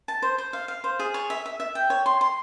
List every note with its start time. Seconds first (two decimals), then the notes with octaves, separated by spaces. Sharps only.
0.08 A5
0.22 C5
0.38 C5
0.53 F5
0.68 F5
0.84 C5
0.99 G#4
1.14 C#5
1.30 E5
1.46 E5
1.60 E5
1.75 G5
1.90 C#5
2.06 C6
2.21 C6